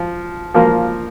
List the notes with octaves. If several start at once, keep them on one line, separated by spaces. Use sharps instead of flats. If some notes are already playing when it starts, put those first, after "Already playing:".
Already playing: F3
F3 A#3 F4 A#4